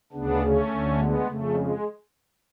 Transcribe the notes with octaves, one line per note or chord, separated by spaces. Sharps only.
D2 C#3 B3 D4
A3 C#4
D2 D3
G#3 B3
F2 C#3 A3
G#3